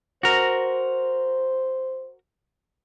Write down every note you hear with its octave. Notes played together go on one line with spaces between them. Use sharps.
F#4 A#4 C5